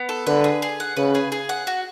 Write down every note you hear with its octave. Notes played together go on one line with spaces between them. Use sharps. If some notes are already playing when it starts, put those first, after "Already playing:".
Already playing: B3
A4
D3 B4
G#4
G#4
F#5
C#3 B4
G#4
G#4
F#5
F#4